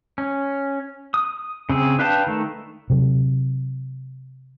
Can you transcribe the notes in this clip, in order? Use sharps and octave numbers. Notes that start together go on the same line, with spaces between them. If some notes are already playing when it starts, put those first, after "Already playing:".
C#4
D#6
C#3 C4 G#4
D4 B4 F5 G5 A5
D#3 A3
C3 F#3